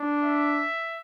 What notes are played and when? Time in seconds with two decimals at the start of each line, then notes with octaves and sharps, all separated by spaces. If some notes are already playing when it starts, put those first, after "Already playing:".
Already playing: D4
0.24 E5